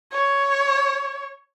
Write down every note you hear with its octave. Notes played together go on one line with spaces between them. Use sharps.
C#5